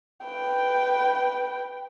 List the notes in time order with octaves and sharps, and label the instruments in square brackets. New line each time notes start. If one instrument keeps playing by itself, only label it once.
[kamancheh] B4 G5